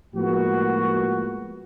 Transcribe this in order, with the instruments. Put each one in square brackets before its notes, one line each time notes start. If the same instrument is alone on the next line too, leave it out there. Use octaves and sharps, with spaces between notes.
[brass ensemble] A2 F3 G#3 A#3 B3 F#4